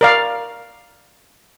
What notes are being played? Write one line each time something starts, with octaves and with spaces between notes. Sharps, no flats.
A#4 D5 F5